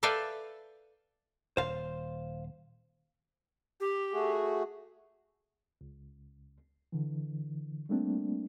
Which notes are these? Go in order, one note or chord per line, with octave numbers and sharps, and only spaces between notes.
A4 B4 D5 E5 F5 G5
D#1 C5 F5
G4
A3 F#4 G#4
C#2
D3 E3
G3 A3 A#3 C4 D4